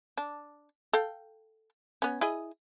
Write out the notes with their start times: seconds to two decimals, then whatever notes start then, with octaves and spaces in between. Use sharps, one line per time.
0.18 D4
0.93 A4 F5 G5
2.02 B3 C#4
2.21 E4 G#4 D#5